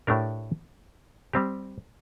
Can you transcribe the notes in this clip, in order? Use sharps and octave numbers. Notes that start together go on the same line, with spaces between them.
A2 A3 D4 G4 A#4
G3 C4 G4